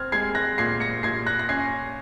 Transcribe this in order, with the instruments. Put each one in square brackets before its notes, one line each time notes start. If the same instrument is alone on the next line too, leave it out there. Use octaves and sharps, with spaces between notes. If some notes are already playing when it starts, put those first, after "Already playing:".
Already playing: [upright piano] C4 [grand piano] F6 G#6
[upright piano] G#3 [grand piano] G#6 C7
[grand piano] F#6 A#6
[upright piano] A#2 [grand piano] G#6 C7
[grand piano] A#6 C#7
[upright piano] A#2 [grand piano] G#6 C7
[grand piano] F#6 A#6
A#6
[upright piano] C#4 [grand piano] G#6 C7